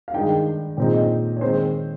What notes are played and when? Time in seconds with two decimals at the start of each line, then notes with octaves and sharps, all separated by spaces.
0.08 F5
0.13 G2 D#3 G#3 D#4 G5
0.77 A#2 G#3 C4 D#4 G5
0.94 D#5
1.37 C#5
1.41 D#3 G#3 C4 D#4 C5